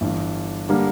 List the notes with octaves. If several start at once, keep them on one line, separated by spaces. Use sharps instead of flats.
G1 G2 E3
D3 G3 A#3